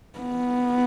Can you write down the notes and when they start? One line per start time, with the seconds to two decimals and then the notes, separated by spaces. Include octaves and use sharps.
0.19 B3